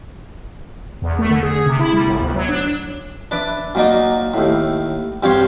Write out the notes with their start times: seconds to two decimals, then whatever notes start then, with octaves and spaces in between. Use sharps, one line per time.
1.02 E2
1.19 A3
1.30 D3
1.43 G#4
1.66 C3
1.79 E4
1.93 G3
2.06 G1
2.21 D2
2.35 F#3
2.49 D4
3.31 D4 B4 D5 E5
3.75 A#2 F#3 A#3 D#4 D5
4.34 D#2 A2
5.23 G2 C4 F4 G4 C#5 C6